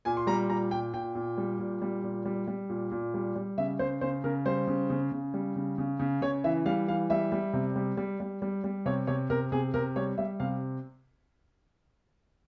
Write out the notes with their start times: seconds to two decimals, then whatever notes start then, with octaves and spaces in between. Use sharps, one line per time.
0.05 A#2 G#5
0.17 C6
0.27 G3 A#5
0.49 A#2 A#5
0.71 A#2 G5
0.94 A#2 G5
1.15 A#2
1.38 G3
1.59 A#2
1.82 G3
2.03 A#2
2.25 G3
2.47 G3
2.69 A#2
2.92 A#2
3.14 G3
3.35 G3
3.58 C#3 E5
3.79 C#3 C5
4.01 C#3 C5
4.24 C#3 A#4
4.46 G3 C5
4.67 C#3
4.90 C#3
5.12 C#3
5.34 G3
5.56 C#3
5.78 C#3
6.00 C#3
6.21 C#3 C#5
6.44 E3 E5
6.66 G3 F5
6.88 E3 F5
7.10 G3 E5
7.32 G3
7.53 C3
7.76 G3
7.97 G3
8.20 G3
8.42 G3
8.64 G3
8.86 C3 C#5
9.07 C3 C#5
9.30 C3 A#4
9.52 C3 G#4
9.74 C3 A#4
9.96 G3 C#5
10.18 G3 E5
10.40 C3 F5